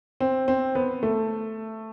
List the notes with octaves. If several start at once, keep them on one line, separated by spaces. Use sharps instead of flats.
C4
C4
B3
A3